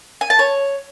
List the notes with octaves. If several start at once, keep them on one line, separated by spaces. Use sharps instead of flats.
G#5
A5
C#5